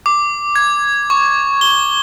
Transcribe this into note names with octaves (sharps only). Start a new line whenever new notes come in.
D6
G#6
C#6
G7